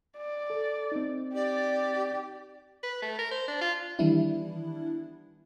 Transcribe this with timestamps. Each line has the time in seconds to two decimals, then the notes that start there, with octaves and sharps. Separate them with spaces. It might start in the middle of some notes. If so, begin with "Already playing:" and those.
0.18 D5
0.50 A4
0.92 C4 D#4
1.35 G4 D5
2.83 B4
3.02 A3
3.19 A#4
3.31 C5
3.48 D4
3.61 F4
3.99 D#3 E3 G3 B3 D4 E4